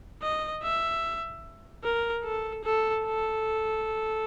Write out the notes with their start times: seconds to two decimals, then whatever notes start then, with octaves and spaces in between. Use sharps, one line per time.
0.22 D#5
0.63 E5
1.84 A#4
2.24 A4
2.64 A4
3.05 A4